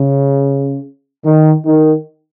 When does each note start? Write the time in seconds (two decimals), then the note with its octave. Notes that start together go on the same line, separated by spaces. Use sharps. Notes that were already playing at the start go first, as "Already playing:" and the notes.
Already playing: C#3
1.25 D#3
1.65 D#3